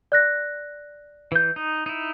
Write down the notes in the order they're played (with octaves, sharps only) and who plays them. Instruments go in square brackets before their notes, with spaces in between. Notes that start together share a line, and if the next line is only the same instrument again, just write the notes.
[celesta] D5 F#6 A#6
[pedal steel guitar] E3 G6
D#4
D#4 E4